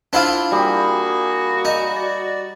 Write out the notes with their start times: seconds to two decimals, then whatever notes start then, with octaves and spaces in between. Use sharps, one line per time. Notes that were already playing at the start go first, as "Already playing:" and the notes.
0.13 D4 E4 F4 C5
0.52 G3 A#3 F#4 G#4
1.65 D#4
1.96 D5